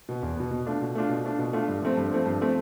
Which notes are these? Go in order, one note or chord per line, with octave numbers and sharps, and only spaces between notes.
B2 B3
E2
B2 B3
B2
A3 D4 F4
B2
A3 D4 F4
B2
A3 D4 F4
B2
A3 D4 F4
G2
F3 A3 C4
G2
F3 A3 C4
G2
F3 A3 C4